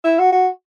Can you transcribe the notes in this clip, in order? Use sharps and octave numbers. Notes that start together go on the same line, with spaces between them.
E4
F#4
F#4